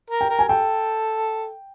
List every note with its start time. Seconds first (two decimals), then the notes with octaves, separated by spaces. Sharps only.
0.10 A#4
0.21 G5
0.30 A#4
0.39 G#5
0.49 A4 G5